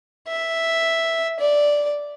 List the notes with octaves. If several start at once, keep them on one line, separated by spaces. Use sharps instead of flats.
E5
D5